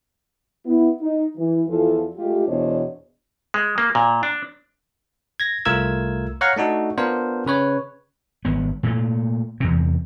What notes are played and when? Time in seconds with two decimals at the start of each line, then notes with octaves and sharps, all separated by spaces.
0.66 B3 E4
1.01 D#4
1.36 E3
1.68 E2 E3 F3 F4 A4
2.16 G#3 A3 F4 G4
2.47 E2 B2 D4 C5 C#5 D#5
3.54 G#3
3.78 A#3
3.95 A#2
4.23 D4
5.40 G#6 A#6
5.65 C2 A3 F4 A#4 E6 G#6
6.41 C#5 F5 F#5 A#5 C#6
6.57 A3 D4 D#4 F#4 A4
6.97 B3 D4 F4 A#4 C5
7.46 C#3 B4 C#5
8.45 G#1 B3
8.83 A#2 A3
9.60 E2 C3